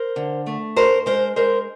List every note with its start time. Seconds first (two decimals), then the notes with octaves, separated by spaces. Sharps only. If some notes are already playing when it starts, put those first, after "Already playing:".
Already playing: A#4 C5
0.16 D3
0.47 A3
0.76 G#2 A#4 C5
1.06 G#3 A#4 C5
1.36 G#3 A#4 C5